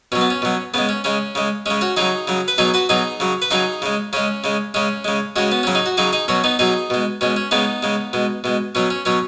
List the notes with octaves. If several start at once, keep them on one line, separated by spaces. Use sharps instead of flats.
B2 F#3 C#4
B3
C#4
B2 F#3
C#3 G#3 B3
C#4
C#3 G#3 C#4
C#3 G#3
C#3 G#3 C#4
C#4 F#4
C#3 F#3 D#4 G#4
C#3 F#3
B4
B2 F#3 D#4 G#4
F#4 B4
B2 F#3 D#4 G#4
C#3 F#3
B4
C#3 F#3 D#4 G#4
C#3 G#3
C#3 G#3 C#4
C#3 G#3
C#3 G#3 C#4
C#3 G#3
C#3 G#3 C#4 F#4
B3
C#3 F#3 C#4
D#4
F#4
C#3 F#3 D#4 G#4
D#4 G#4
B2 F#3 C#4 F#4
B3 D#4
B2 F#3 D#4 G#4
B2 G#3
B2 G#3 C#4
C#4
C#3 G#3 B3 D#4
C#3 G#3
B2 G#3
B2 G#3
B2 F#3 C#4
C#4
B2 F#3 C#4